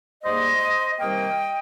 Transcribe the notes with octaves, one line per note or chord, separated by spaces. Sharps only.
G#2 G3 A#3 C5 D#5
C3 D#3 G3 A#3 D#5 G5